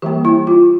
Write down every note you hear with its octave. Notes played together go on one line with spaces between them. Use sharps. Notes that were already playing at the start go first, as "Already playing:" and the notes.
E3 G3 A#3 G4
E4
F4